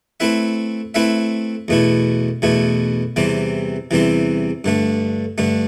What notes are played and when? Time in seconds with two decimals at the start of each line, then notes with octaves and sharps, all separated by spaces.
0.20 A3 C4 E4 B4 E5
0.94 A3 C4 E4 B4 E5
1.68 E2 B2 A3 E4
2.42 E2 B2 A3 E4
3.16 E2 C3 E3 G3 C4
3.91 E2 C3 E3 G3 C4
4.64 G2 D3 A3
5.38 G2 D3 A3